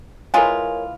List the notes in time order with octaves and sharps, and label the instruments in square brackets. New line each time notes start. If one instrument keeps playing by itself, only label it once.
[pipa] E3 G#3 F4 [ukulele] A#4 C#5 G#5